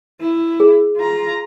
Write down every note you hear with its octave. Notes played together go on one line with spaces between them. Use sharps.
E4
G#4
F4 A#5